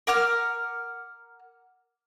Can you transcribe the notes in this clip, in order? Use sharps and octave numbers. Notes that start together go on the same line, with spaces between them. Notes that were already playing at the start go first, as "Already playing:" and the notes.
A#4 F#5 D6 F6